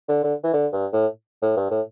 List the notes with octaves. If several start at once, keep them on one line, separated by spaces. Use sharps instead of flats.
D3
D3
E3
D3
G2
A2
A2
G2
A2